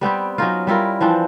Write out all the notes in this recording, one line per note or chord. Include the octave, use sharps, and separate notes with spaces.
G3 B3 C4 G4
F#3 C#4 D#4 F4
G3 E4 F4 A#4
E3 F3 C4 D4